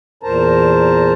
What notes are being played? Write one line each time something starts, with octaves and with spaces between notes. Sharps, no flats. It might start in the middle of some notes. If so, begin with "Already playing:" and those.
E2 A#2 A#4 C5 A5 A#5